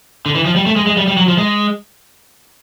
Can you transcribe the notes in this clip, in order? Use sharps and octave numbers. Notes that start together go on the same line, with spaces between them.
D3
E3
F3
G3
A3
G#3
G#3
G3
G3
F#3
F3
G#3